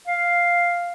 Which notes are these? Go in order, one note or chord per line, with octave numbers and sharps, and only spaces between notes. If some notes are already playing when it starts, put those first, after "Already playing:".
F5